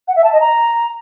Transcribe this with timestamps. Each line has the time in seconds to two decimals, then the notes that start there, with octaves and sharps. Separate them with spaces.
0.08 F#5
0.16 E5
0.24 A5
0.32 D#5
0.41 A#5